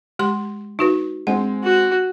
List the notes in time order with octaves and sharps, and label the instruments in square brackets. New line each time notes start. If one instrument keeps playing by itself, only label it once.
[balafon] G#3 G4 C6
D#4 F#4 B4
[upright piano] G#3 C4 [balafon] F#5
[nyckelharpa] F#4